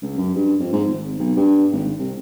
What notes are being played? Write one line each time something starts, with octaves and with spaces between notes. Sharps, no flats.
C#2
F#2
G2
F2
G#2
G#1
B1
G2
G#1
C2